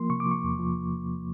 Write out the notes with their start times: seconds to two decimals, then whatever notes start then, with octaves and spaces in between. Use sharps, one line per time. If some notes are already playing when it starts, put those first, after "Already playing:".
Already playing: F3 A#3 C6
0.10 C3 C#6
0.20 D6
0.26 F3
0.31 C#6
0.44 E2
0.59 F3